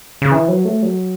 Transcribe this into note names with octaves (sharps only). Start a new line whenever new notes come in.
C#3
E3
F#3
A3
F#3